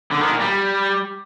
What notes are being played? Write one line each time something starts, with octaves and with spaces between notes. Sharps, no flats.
D3
D#3
A#2
G3